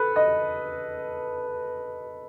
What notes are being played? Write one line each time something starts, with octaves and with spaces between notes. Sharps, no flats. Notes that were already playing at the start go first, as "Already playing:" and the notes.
Already playing: A4 B4
D#5